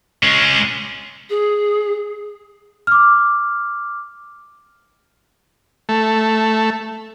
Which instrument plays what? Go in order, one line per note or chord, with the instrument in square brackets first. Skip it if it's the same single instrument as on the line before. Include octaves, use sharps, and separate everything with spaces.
[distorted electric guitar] G#3 C#4
[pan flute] G#4
[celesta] D6 F6
[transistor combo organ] A3